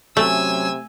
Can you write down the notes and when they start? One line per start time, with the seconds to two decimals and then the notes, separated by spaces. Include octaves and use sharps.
0.17 C3 F#3 A3 C#4 G#5 E6